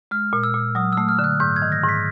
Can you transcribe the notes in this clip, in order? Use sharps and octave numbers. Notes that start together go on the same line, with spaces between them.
G#3 F6
A#2
E6
A#2
F#3 D#6
E6
A3
F6
D3
F#6
G#2 G6
G#6
D#3
A#6
G#2
B6